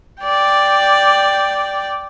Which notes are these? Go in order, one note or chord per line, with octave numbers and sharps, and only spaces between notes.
D5 G5